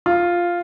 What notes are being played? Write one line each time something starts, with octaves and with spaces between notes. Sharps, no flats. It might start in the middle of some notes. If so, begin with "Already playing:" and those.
F4